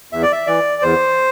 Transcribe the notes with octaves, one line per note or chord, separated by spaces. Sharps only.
E2 E5
D5
E5
E3 D5
E2 C5